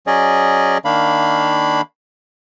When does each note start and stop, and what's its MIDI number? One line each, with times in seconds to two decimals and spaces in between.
0.07 0.78 54
0.07 0.78 61
0.07 0.78 68
0.07 0.78 74
0.07 0.78 75
0.85 1.81 51
0.85 1.81 58
0.85 1.81 62
0.85 1.81 77
0.85 1.81 83